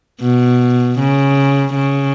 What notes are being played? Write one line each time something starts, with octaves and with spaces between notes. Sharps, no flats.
B2
C#3
C#3